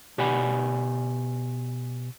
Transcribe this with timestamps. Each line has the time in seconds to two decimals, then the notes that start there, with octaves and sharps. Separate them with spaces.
0.18 B2 G4 D5 F#5 G#5 B5